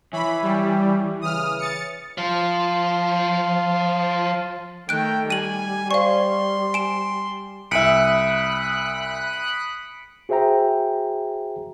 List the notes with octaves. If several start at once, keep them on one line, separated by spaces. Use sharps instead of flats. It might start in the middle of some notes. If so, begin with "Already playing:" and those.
E3 C#5 E5 G#5 B5
G3
C#3 E3 D#6 F6
A6 C#7
F3 F5 A5 C6
D#3 A3 G5 F#6 D7
G3 G#5 D#7 F#7
C5 D5 F5 C6 C#6
G#5 D7 E7
C2 E5 B5 D#6 F#6 C#7 D7 F#7
F#4 G#4 C5 E5 G5 A#5